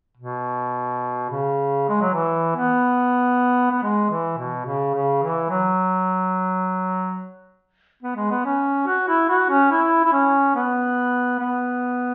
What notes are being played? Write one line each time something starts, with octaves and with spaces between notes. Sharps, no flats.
B2
C#3
G#3
F#3
E3
B3
B3
G#3
E3
B2
C#3
C#3
E3
F#3
B3
G#3
B3
C#4
F#4
E4
F#4
C#4
E4
E4
C#4
B3
B3